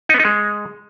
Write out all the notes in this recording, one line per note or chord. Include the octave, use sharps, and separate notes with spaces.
D#4
B3
D#4
G#3